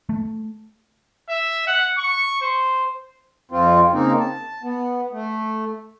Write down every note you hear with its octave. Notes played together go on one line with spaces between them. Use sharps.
A3
E5
F#5
C#6
C5
F2 F3 C4 F4
C#3 A#3 C4 D#4
A5
B3
A3